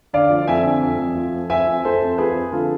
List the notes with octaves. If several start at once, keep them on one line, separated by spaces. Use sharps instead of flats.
D3 D5 F5
F3
F2 E5 G#5
D3
F2
F2
F3
F2
F2 E5 G#5
F3
F2 A4 C5
F2
F3 G#4 B4
F2
D3 F4 A4